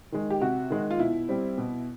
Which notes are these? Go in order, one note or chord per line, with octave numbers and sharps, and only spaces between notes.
D#3 G#3
G4
C3 F#4
D#3 G#3
F4
B2 E4
G3 C4
B2